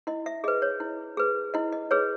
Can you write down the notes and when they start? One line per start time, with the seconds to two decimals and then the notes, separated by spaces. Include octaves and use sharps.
0.07 E4 D#5
0.26 E5
0.44 G#4 B4 D#5
0.62 C#5
0.80 E4
1.17 G#4 B4
1.54 E4 D#5
1.72 D#5
1.91 G#4 B4 C#5